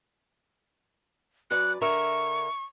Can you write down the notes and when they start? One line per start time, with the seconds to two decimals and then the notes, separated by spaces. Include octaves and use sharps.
1.51 F#2 B4 D5 F#6
1.81 D3 A#4 E5 C#6